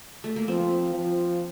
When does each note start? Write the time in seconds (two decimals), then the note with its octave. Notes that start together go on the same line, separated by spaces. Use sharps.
0.24 A3
0.36 A#3
0.48 F3 C4
0.94 F3